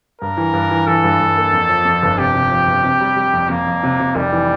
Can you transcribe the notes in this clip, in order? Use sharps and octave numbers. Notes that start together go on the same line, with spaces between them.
G2 A#4
E3
G2
E3
E3 A4
G2
G2
A#3
F2
F3
F2
G1
C3 G4
C3
F3
G1
C3
G3
G3
F2
F2 A#3
F2
C3
C3
F1 G3
E3